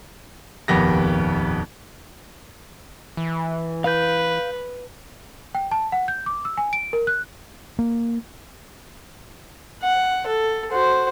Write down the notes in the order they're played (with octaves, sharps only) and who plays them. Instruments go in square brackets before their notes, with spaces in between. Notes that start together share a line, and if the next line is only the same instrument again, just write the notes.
[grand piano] D#1 G#1 F2 B3 G4 A#6
[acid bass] E3
[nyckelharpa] B4 [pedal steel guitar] F5 G6
[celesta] G5
A5
F#5
G6
D6
E6
G#5
D7
A#4
F#6
[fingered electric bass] A#3
[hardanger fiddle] F#5
A4
F#4 C5